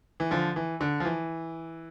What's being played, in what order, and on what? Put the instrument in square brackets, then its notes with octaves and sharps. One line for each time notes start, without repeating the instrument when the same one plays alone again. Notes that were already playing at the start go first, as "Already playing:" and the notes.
[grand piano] E3
D3 F3
E3
D3
F3
E3